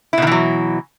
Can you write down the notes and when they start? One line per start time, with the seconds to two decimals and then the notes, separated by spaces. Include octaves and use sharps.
0.13 E4
0.18 B2
0.22 D#3
0.27 E3
0.32 F#3